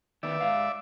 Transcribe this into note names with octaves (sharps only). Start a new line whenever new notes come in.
D#3 B3 D5 E5
G#2 F5